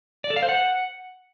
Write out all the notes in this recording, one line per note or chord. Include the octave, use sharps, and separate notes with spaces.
D5
A4
F5
C5
F#5